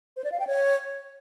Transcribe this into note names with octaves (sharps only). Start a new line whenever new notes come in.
C5
D5
F5
G5
C#5